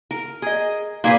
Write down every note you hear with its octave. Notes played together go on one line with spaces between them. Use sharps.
A#4
G#4 D#5
A#2 A#3 G#4 B4